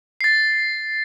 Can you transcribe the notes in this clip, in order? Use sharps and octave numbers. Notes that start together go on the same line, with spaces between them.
A6 C7